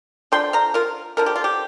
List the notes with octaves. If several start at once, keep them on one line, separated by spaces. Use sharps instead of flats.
D3 F3 D4 G5 C6
F5 A#5
F4 A#4
D3 F3 D4 A#4
G4
F4
G4